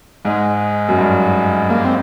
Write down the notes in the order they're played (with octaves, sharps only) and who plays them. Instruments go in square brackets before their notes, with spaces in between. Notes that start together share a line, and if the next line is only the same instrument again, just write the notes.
[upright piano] G#2 [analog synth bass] G#3
[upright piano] F#2
G2
[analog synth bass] A#3
C4